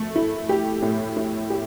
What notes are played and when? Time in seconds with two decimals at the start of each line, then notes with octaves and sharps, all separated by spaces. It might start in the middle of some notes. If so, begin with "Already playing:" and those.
Already playing: A3
0.16 E4
0.49 G4
0.82 A2
1.17 E4
1.50 G4